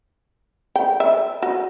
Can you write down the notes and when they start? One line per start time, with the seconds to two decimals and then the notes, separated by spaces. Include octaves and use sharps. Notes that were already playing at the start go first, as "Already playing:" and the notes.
0.76 G5
1.00 E5
1.42 F#4